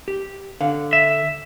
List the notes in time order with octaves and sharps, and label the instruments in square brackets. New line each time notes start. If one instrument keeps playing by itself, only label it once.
[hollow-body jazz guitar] G4
D3 F5
[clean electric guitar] E5